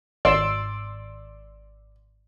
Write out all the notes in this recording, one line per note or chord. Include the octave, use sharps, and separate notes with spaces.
G#1 D5 C6 E6